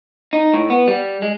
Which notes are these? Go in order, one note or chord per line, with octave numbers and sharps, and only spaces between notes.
D#4
A2
B3
G3
G#3